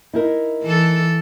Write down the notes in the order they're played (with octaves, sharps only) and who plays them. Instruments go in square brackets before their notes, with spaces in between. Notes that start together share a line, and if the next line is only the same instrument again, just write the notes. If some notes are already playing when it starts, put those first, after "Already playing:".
[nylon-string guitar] D#4 E4 A#4
[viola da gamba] E3 A4